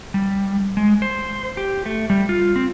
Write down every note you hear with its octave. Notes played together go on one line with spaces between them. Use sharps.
G3
G#3
C5
G4
A3
G3
F4
C4